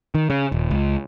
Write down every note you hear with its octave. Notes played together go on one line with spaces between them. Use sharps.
D#3
C#3
D#1
C#2